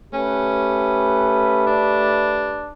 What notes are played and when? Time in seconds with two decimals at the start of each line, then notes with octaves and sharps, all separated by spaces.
0.14 A3 C#4 G4 B4
1.67 D4